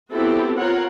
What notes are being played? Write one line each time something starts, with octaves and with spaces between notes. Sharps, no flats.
B3 C4 E4 F#4 G4 A4
F4 A#4 C#5 F#5